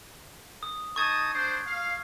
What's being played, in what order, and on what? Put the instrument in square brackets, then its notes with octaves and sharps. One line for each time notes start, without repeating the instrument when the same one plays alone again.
[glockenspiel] D#6
[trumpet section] D#4 A5 D#6 [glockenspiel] C#6 G#6
[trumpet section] D4 C5
F5